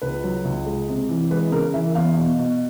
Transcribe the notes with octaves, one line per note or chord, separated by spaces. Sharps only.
C#2 B4
F#3
C#2
G#3
C3
E3
G#3 B4
C#3 A#4
E3 E5
E2 F5
B2
B2